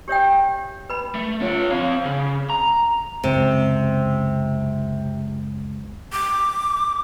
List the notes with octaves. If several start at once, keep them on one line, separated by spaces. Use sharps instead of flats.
G4 C#5 E5 G5
B4 B5
A3
F4 C#5
C4 F5
C#3
A#5
C#2 F#2 C3
D6